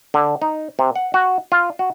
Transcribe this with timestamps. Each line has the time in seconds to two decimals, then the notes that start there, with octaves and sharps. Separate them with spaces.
0.14 D3
0.42 D#4
0.79 C3
0.96 F#5
1.14 F#4
1.52 F4
1.79 F#4